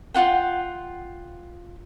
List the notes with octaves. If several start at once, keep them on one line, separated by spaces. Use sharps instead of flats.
F4 F#5 G5